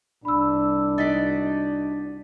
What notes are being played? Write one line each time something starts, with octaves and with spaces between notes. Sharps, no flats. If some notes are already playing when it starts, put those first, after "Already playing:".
C2 D4 B5 E6
D#4 F#4 D5 A6 B6